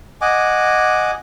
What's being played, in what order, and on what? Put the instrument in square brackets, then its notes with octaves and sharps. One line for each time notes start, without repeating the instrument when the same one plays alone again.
[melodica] D#5 F#5 G#5 D6